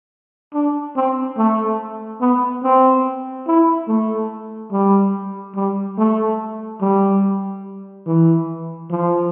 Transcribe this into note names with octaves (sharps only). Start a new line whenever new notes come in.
D4
C4
A3
B3
C4
E4
A3
G3
G3
A3
G3
E3
F3